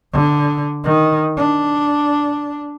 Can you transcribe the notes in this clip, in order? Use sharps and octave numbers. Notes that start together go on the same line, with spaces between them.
D3
D#3
D4